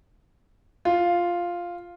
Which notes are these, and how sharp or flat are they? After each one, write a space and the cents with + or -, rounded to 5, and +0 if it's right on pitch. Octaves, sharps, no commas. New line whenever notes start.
F4 +0